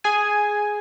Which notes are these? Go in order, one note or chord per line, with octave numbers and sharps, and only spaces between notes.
G#4 G#5